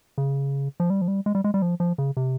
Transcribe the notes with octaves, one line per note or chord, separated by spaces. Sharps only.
C#3
F3
G3
F3
G3
G#3
G3
G#3
G3
F3
F3
C#3
C3